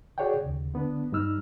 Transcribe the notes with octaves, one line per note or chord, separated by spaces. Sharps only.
F#4 G#4 C#5 D5 F#5 G5
D#2 C#3
D3 B3 D4
G2 G3 D#4 E6 F6